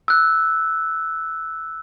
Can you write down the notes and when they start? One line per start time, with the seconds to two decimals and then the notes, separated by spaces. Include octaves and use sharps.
0.08 E6 F#6